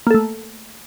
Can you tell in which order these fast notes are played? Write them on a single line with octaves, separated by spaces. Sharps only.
A#3 A4 A3